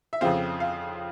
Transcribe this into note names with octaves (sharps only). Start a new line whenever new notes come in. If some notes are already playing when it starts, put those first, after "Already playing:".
E5
F2 C#3 F3 C4 F5
F5